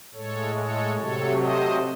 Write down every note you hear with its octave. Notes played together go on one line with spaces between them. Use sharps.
A2 G#3 A4 C#5
A4 C#5
C3 F#3 A3 A4 C#5
C5 D#5